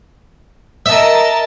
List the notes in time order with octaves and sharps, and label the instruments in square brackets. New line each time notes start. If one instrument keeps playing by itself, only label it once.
[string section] A#4 D#5 A5 [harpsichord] E5